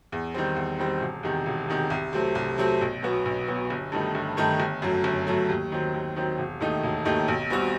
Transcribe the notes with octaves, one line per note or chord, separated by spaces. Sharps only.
E2
D#3 G3 C4
E2
D#3 G3 C4
E1
E2 C3 D#3
E1
E2 C3 D#3
C2
C3 F#3 A3 C4
C2
C3 F#3 A3 C4
B1
B2 F#3 B3 F#4
B1
B2 F#3 B3 F#4
G1
G2 D#3 A3 D#4
G1
G2 D#3 A3 D#4
G1
F#2 F#3 A3
G1
F#2 F#3 A3
D#2
D#3 F#3 C4
D#2
D#3 F#3 C4
E1
D#2 D#3 A3 D#4
E1
D#2 D#3 A3 D#4
B1
B2 G3 C4 F#4